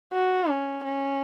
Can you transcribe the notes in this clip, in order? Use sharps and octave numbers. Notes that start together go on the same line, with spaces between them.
F#4
C#4
C#4